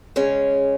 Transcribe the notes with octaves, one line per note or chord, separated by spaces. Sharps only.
C#3 G#3 C#4